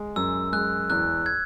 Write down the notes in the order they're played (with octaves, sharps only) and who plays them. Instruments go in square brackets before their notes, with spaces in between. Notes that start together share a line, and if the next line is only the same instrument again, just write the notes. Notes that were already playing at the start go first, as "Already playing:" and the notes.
Already playing: [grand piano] G#3
[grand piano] F#2 [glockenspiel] E6
[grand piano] G#3 [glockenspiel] F#6
[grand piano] E2 [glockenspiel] F#6
[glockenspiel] G#6